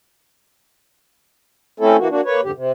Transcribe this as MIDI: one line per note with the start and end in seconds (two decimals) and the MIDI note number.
1.80 1.97 57
1.80 1.97 60
1.80 1.97 61
1.80 1.97 64
1.80 1.97 69
1.98 2.08 52
1.98 2.08 58
1.98 2.08 66
2.10 2.21 58
2.10 2.21 62
2.10 2.21 66
2.25 2.41 58
2.25 2.41 71
2.25 2.41 73
2.43 2.51 41
2.43 2.51 44
2.43 2.51 50
2.43 2.51 67
2.55 2.72 48